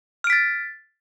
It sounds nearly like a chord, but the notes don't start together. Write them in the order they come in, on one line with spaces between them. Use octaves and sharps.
F6 D7 B6 A6